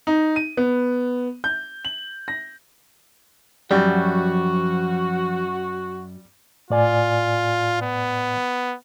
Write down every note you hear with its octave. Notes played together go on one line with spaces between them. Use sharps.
D#4
D#7
B3
G6
F#7
A#6
F#2 F3 G3 F#4
A2 F4 D5 G#5
B3